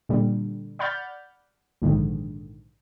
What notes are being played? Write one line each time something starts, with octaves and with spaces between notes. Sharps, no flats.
A#2 D3 G3
D5 F#5 B5 F6 G6 A6
A#1 G#2 D3 D#3